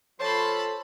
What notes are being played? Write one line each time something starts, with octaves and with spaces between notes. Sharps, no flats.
F3 A4 C5 C#5 A5 B5 C6